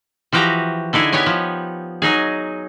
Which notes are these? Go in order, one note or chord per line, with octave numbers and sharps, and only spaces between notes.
E3 F3 F#4 G4 A#5
D3 D#4 E4 G#4
B3 G4 C#5 G#5
F3
F#3 D#4 G#4